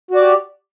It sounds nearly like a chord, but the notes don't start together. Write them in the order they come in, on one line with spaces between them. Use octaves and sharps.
F#4 D5 G4